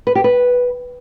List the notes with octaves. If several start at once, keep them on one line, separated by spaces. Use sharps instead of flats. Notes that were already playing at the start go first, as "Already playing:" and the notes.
B4
G4
B4